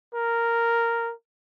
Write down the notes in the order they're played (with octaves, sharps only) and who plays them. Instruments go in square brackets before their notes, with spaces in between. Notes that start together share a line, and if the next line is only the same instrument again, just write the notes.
[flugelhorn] A#4